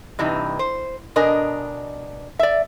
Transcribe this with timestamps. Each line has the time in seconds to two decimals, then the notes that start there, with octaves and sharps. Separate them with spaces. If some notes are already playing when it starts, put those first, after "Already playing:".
0.19 G2 C3 E3 D#4
0.59 C5
1.16 B2 D4 A#4 D#5 G#5
2.39 D5 E5